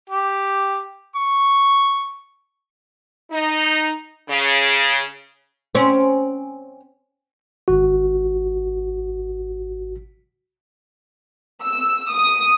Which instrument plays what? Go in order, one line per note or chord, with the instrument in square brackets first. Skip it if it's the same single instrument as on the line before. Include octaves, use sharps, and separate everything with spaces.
[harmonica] G4
C#6
[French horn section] D#4
C#3
[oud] C4 C#4
[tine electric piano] G#1 F#4
[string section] E6
D#6